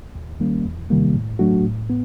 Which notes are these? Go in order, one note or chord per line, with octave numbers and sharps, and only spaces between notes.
D#2
D#3 G3 A#3 C#4
E2
C3 D#3 G3 A#3
A2
F#3 A3 D4 F#4
A2
B3